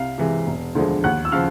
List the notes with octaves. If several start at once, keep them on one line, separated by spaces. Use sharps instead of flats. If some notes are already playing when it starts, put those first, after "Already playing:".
Already playing: C2 F5
C3 E3 G#3
E1
D2 D3 F3 G#3
D#2 F#5 F#6
E6
C#3 F3 F5 F6